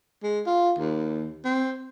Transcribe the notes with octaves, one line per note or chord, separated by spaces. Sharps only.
G#3
F4
D#2
C4